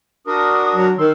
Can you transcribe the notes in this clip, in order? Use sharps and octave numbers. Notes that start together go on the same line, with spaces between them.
D4 F#4 A#4 D#6
F#3
D#3 C6 E6